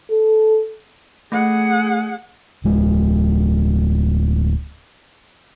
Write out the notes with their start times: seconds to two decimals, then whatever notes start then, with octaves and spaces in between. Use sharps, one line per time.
0.11 A4
1.32 A3 G#4 F#5
2.65 D1 G#3